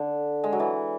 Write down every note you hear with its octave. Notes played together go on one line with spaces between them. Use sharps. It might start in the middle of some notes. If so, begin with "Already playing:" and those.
Already playing: D3
G#3
F#3
E3